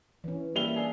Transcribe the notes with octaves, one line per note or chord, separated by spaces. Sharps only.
E3 C#4
G3 A#3 E5 F7 G7
D4 G#4